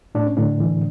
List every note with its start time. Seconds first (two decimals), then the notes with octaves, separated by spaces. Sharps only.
0.15 A2 D4
0.27 C#4
0.37 A2 D3 D4
0.60 E3